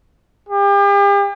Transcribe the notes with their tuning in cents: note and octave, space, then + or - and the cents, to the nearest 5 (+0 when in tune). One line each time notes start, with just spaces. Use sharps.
G4 +40